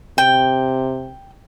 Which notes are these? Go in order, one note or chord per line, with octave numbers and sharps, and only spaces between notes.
C3 G5